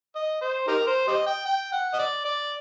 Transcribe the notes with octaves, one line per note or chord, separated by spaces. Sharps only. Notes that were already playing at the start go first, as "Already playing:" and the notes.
D#5
C5
D#4 G4 A#4
C5
G4 C5 D#5
G5
G5
F#5
D#5
D5
D5